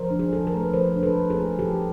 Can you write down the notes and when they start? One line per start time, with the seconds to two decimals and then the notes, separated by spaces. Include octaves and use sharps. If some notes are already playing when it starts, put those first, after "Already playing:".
Already playing: F3 A#4 C5
0.10 D4
0.19 G#4
0.32 F3 A4
0.47 A#4
0.53 A3
0.60 B4
0.74 F3 A#4 C5
0.96 D4
1.03 A4 B4
1.16 F3
1.30 G#4 A#4
1.37 A3
1.58 F3 G4 A4